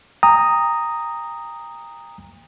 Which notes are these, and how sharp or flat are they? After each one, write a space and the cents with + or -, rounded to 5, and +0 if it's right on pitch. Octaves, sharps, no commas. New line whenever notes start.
G5 +40 A#5 -5 D#6 +0